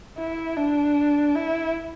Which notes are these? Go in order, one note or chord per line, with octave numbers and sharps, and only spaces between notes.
E4
D4
E4